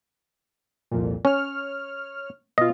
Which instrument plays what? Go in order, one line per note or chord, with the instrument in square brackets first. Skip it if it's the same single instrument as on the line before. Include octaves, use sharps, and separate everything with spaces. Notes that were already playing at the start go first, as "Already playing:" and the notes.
[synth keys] C2 F2 A#2
[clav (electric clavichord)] C#4 [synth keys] C#5 F6
[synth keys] B2 F4 [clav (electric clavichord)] D#5